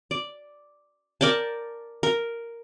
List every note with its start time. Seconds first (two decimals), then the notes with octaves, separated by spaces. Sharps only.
0.11 D5
1.21 A#4 D5 G5 A5
2.03 A#4